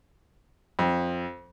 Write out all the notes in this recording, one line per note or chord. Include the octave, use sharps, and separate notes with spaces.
F2